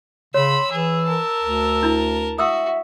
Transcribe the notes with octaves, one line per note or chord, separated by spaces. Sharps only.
C#3 C#5 B5 C6 E6
E3 G#4 E6
A#4 A5
D2
D4 E4
F#4 E5 D#6 E6